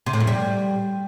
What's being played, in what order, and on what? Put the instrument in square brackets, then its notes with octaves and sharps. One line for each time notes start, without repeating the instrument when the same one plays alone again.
[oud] C3
A2
F2
G3